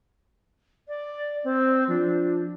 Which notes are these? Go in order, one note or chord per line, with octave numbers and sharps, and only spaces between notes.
D5
C4
F3 D4